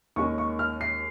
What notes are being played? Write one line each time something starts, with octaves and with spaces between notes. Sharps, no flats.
D#2 D#3 G#3 C#4 C#6
C#6
F6
C7